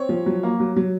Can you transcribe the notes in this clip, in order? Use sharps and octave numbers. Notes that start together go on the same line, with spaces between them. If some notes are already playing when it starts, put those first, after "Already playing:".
Already playing: C4 C#5
F3
F#3
A#3
F#3
F#3